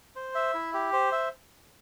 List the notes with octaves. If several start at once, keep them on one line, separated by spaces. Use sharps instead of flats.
C5
E5
E4
G4
C5
E5